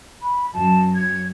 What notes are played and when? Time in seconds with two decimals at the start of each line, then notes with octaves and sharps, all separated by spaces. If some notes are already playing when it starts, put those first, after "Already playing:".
0.22 B5
0.53 F#2 A5
0.95 G#6